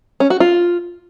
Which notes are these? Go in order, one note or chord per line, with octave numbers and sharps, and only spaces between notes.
C#4
F#4
F4